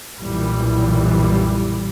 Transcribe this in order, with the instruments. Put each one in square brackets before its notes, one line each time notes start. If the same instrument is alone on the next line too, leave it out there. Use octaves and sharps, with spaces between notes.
[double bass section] B1 F#2 A#2 E3 G3